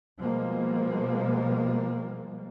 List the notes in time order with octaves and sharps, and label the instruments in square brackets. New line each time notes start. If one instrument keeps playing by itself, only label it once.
[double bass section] B2 F3 G3 G#3 A#3